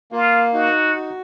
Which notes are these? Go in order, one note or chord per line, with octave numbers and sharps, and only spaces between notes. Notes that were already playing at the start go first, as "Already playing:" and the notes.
A#3 F4
D#4 F#4
F#4